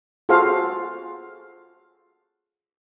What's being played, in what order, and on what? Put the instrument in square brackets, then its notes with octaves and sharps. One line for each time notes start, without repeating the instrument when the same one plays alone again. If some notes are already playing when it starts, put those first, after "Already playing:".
[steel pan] F4 F#4 G#4 A4 C5 F5